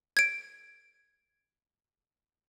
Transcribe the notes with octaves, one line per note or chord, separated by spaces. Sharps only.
G#6 D7